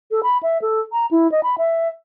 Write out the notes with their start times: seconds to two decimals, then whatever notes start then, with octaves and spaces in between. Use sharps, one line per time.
0.11 A4
0.23 B5
0.43 E5
0.62 A4
0.92 A#5
1.11 E4
1.32 D#5
1.43 B5
1.58 E5